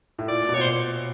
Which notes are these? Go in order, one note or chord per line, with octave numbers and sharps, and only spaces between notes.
A2
A#2 D5
B2
A#2 C#5
C5